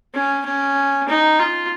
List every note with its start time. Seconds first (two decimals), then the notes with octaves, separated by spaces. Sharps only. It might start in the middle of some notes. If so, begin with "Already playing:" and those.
0.14 C#4
0.46 C#4
1.08 D#4
1.40 F4